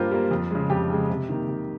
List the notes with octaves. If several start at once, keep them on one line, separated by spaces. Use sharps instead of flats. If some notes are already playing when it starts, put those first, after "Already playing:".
Already playing: G2 G3 A#3 F4 G4 A#4 C5
G3 A#3
F2
C#3 G#3
F2 G4
C#3 G#3
C3
D#3 A#3
C3